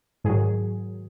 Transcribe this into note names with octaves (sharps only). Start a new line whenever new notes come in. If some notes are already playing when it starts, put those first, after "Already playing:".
G#2 D#3 F#3 G#4